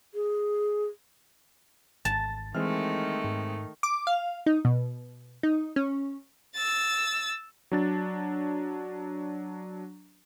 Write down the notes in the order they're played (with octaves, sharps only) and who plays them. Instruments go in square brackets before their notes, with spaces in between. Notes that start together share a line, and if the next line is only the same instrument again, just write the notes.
[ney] G#4
[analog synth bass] G#1 [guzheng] A5 [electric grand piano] A6
[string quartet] D#3 A3 [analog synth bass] E3 [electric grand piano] G#3 C4 F6
[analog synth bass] G#2
[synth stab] D6
F5
D#4
B2
D#4
C#4
[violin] E6 A6
[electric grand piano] F#3 D4 A6